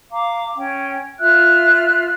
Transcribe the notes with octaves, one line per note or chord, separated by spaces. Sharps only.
F5 A#5 D6
C#4 G5
F4 E5 F6 F#6